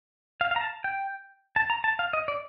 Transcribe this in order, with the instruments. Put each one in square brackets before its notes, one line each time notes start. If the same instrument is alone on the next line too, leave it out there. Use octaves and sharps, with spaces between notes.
[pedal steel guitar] F5
F5
A#5
A5
G5
A5
A#5
A5
F5
D#5
D5